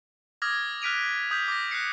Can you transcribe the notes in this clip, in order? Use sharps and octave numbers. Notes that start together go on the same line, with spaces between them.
D6 D#6 F6 G#6 A#6
F6 F#6 B6 D7 D#7 F7
D#6 G6 B6
D6 A#6
F#6 A#6 C7 C#7